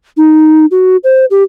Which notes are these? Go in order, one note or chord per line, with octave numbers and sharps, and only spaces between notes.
D#4
F#4
C5
G4